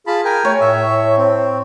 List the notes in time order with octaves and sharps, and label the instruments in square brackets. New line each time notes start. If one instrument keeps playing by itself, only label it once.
[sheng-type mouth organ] F4 A5 B5 [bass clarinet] G#4
[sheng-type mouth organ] A#4 G5 G#5
[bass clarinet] A3 [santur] C#5
[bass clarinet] A2 [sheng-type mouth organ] E5
[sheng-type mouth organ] C4